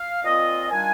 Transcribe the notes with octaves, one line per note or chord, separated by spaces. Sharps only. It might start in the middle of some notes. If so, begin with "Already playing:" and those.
Already playing: F5
A#2 F3 C4 F4 D#5
D#3 G3 D4 F4 G#5